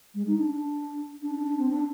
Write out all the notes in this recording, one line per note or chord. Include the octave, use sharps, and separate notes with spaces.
G#3
D#4
D4
D4
D4
D4
D4
C4
D4